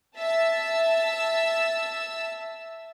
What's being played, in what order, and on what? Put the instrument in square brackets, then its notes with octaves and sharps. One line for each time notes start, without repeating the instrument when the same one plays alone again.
[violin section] E5 A5 E6